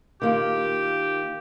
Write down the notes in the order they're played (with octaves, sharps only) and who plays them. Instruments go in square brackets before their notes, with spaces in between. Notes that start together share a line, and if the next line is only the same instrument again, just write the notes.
[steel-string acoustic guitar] D#3 A#3 F4 [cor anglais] G4